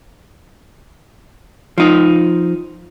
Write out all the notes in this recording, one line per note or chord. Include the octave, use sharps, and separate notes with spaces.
F3 D#4